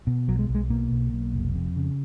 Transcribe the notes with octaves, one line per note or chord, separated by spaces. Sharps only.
B2
B1 F#3
G#3
B1
G#3
B2 A#3
B1
B1
F1
F2
C#3